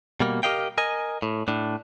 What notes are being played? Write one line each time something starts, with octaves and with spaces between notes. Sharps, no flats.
B2 G3 A#3
G4 A#4 D#5 F5 G5
A#4 D#5 G#5
A2
A2 D4